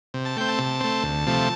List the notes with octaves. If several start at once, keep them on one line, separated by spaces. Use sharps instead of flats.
C3
A5
A3 C4 G5
A5
C3
A3 C4
D2
C3 F3 A3